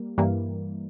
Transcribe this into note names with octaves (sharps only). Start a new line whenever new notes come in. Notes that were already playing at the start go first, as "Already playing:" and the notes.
Already playing: G3 A#3
G2 E3 G3 A#3